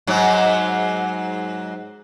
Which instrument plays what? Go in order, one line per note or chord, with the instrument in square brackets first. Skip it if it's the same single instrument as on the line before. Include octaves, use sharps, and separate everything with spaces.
[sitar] G#2 F#3